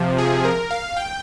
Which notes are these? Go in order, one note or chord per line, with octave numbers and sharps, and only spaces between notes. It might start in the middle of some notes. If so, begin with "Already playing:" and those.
Already playing: C3 F3
G#4
A#4
F5
G5